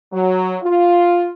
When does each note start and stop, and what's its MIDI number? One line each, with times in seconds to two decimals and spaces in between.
0.12 0.55 54
0.62 1.30 65